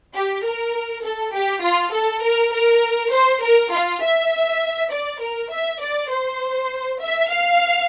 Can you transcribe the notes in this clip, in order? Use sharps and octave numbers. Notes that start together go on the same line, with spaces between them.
G4
A#4
A4
G4
F4
A4
A#4
A#4
C5
A#4
F4
E5
D5
A#4
E5
D5
C5
E5
F5